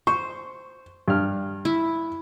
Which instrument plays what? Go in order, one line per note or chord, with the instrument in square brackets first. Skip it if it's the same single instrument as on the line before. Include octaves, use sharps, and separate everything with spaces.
[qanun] C5 [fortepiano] C#6
[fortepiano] G2 F6
[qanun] E4